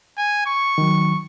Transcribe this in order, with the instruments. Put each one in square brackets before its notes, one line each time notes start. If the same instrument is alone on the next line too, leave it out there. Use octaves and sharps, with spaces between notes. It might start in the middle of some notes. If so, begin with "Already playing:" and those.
[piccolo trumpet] G#5
C#6
[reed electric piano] D#3 F#3